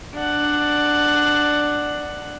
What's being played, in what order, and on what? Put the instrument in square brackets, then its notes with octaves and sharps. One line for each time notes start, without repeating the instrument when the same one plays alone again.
[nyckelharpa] D4 F#5